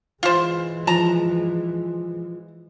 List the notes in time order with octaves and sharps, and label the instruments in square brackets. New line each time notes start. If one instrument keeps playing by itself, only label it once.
[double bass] E3 G#3 [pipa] F4 C5
[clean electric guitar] F3 [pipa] A5 A#5